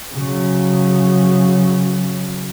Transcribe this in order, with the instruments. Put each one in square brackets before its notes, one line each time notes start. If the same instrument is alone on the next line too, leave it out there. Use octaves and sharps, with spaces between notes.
[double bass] C#3 F#3